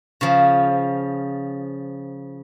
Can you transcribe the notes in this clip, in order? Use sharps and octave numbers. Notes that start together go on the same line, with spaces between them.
C#3 F3